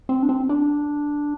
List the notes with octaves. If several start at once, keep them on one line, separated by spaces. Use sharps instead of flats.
C4
D4
C4
D4